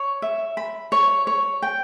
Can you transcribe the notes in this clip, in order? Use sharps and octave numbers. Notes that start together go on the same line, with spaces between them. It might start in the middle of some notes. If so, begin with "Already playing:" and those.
Already playing: C#5
E5
B5
C#5
C#5
G5